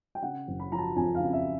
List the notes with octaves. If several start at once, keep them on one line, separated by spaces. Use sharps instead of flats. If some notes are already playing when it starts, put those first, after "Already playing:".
G5
C#3 F#5
F#1
B5
F3 A#5
A5
F2 G#5
F5
C#3
E5